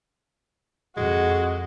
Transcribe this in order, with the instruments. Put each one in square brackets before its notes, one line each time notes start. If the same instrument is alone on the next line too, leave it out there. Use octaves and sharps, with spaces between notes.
[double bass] F2 [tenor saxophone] G#3 [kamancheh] F#4